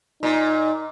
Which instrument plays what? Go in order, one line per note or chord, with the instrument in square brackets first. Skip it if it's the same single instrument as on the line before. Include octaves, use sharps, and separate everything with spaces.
[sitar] A#2 [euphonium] D#4